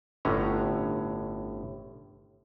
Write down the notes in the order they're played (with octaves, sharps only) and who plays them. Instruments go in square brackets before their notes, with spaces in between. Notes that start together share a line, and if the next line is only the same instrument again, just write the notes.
[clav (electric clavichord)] G1 A2 D3 C#4 A#5